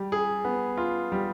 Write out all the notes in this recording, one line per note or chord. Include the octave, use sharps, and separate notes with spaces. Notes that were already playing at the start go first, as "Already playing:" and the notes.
Already playing: G3
G#4
B3
F4
G3